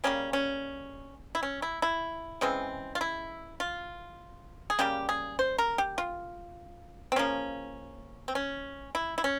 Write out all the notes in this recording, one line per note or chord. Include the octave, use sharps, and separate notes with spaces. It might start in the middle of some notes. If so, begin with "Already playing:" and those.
C#3 G3 A#3 C#4
C#4
E4
C#4
E4
E4
C#3 E3 G#3 C4
F4
E4
F4
G#4
C#3 G3 A#3 G4
G#4
C5
A#4
G4
F4
C4
C#3 F3 A#3 C#4
C4
C#4
E4
E4
C#4